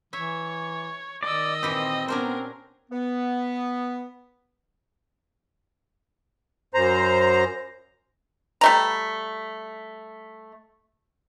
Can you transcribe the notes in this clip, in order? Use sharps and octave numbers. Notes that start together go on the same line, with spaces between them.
E3 C#5 E5
D#3 D5 D#5 E6
A#2 E3 C4 G4
B3 C#4 D4 A#4 C5
B3
F#2 C5 A#5
G3 A3 A#5